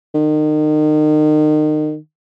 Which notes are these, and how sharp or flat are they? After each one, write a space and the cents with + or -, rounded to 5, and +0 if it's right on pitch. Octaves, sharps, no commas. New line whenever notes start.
D#3 -30